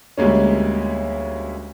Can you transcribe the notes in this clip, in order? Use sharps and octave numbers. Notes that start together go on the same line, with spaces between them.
D2 G3 G#3 A#3 C#4